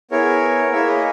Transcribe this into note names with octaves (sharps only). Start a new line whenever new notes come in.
B3 E4 G#4 A#4 C#5
A#3 E4 G#4 C#5 E5
B4 D#5